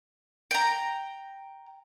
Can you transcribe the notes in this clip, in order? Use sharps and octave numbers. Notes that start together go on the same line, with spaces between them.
G5 A#5